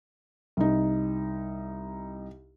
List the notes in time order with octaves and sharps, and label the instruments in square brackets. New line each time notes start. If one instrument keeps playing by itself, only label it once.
[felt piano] C2 D#4